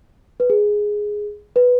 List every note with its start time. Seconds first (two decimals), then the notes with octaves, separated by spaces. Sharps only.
0.40 B4
0.50 G#4
1.56 B4